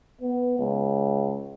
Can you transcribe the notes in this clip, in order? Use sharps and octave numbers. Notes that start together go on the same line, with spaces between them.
B3
C#2